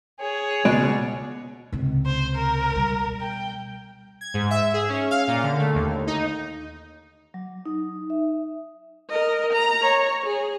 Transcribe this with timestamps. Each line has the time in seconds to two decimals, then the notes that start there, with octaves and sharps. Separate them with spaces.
0.19 G#4 C#5
0.65 C#2 B2 G#3 D5
1.72 C#2 C3
2.06 C5
2.35 A#4
2.76 B2 G3
3.21 G5
4.21 G#6
4.34 G#2
4.51 E5
4.74 G#4
4.89 C#4
5.11 F5
5.28 A#2
5.43 D3
5.59 A3
5.75 D#2
6.07 D#4
7.34 F#3
7.66 D#4
8.10 E5
9.10 A#4 D#5
9.53 A#5
9.82 C#5
10.26 G#4